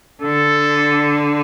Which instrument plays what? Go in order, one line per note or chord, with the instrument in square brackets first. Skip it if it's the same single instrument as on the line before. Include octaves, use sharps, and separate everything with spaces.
[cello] D3 [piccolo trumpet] A4